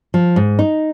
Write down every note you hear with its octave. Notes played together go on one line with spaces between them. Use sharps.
F3
G#2
D#4